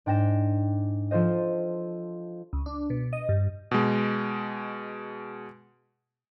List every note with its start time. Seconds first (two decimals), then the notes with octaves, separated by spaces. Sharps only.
0.06 G#2 D4 G5 A#6 E7
1.11 F3 F4 A4 C5 D#5
2.53 C#2
2.66 D4
2.90 B2
3.13 D#5
3.29 G2
3.71 B2 G#3